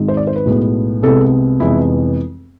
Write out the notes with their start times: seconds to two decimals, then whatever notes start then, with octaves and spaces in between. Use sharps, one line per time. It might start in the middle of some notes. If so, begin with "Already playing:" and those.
Already playing: G#1 G#2 G#3
0.08 C5
0.17 D5
0.27 C5
0.36 B4
0.45 B1 A2 G#3 B3
1.02 C2 C3 G#3 B3 A4
1.59 F1 F2 E3 G#3 B3 E4